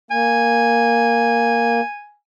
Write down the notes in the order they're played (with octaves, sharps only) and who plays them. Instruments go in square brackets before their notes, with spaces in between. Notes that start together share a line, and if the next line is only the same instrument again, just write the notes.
[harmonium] A#3 [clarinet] G#5